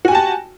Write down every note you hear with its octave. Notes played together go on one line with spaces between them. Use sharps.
F#4 G4 G#5 A5